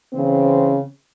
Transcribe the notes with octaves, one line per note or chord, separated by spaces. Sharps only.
C#3 E3 C4